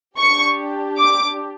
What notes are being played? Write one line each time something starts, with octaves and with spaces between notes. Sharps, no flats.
D4 G4 C#6
D6